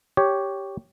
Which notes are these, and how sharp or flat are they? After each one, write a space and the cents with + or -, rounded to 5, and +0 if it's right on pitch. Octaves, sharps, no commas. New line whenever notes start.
G4 +0 C#5 +5